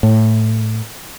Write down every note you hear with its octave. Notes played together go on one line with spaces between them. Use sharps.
A2